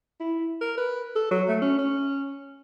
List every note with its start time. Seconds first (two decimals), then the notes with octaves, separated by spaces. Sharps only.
0.20 E4
0.61 A#4
0.77 B4
1.16 A4
1.31 F#3
1.48 A3
1.62 C#4
1.78 C#4